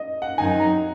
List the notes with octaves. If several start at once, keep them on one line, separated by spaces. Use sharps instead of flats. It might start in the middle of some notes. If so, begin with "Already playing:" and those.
Already playing: D#5
F#5
F#2 D#3 F#3 C4 D#4 G#5
A#5